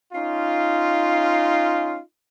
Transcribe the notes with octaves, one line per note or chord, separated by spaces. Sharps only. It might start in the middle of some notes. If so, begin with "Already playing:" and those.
C#4 D#4 F4